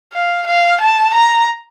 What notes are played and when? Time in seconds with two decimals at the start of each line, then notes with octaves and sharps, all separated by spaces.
0.13 F5
0.47 F5
0.81 A5
1.14 A#5